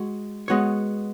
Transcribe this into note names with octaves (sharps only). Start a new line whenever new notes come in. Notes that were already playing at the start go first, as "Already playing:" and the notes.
Already playing: G#3 F#4
G#3 B3 F#4 C#5